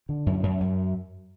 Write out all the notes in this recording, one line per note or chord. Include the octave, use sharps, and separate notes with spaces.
D3
F#2
F#2
F#2